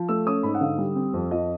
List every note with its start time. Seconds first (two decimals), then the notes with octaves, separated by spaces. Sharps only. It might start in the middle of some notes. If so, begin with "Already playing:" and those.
Already playing: F3
0.09 A3 E6
0.26 C#4 D#6
0.43 G#2 B5
0.55 F#5
0.61 D3 F5
0.78 G3
0.95 C4
1.14 F2
1.31 F3 D#5